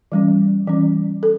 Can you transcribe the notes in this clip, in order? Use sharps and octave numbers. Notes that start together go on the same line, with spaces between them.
E3 G3 C#4
E3 G3 C#4
A4